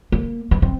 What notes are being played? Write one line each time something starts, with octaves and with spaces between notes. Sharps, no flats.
A#3
B3
C4